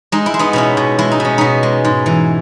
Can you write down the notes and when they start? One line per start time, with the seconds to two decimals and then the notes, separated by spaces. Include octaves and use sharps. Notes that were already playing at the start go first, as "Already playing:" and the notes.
0.12 G#3 D#4
0.26 E4
0.34 G#3
0.39 B3 D#4
0.53 B2 C#4 E4
0.77 B2
0.99 G#3 E4
1.11 D#4
1.20 B2 C#4
1.38 B2 B3 D#4
1.63 G#3
1.85 G#2
2.06 E3